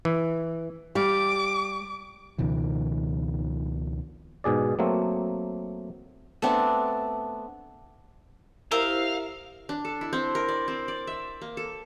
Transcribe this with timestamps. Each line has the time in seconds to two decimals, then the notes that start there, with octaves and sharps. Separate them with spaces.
0.05 E3
0.95 G3 F5 D6
2.38 C#2 B2 D#3 F3
4.44 G#2 B2 G#4 D5
4.79 F#3 A3 A#3 C4
6.42 A3 B3 C4 D4
8.71 E4 G4 A#4 C5 E5 F5 D#6
9.69 D4
9.85 A4
10.01 E4
10.13 C4
10.35 A#4
10.49 D5
10.68 C4
10.88 D5
11.07 E5
11.42 A#3
11.57 A4